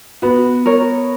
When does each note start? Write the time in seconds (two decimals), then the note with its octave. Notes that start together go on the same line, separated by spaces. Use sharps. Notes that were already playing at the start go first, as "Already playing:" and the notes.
0.22 B3 F#4
0.66 A#4 C#5